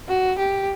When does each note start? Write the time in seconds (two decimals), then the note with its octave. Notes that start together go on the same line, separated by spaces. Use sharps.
0.08 F#4
0.38 G4